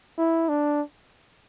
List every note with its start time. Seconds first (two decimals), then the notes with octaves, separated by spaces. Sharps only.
0.18 E4
0.49 D4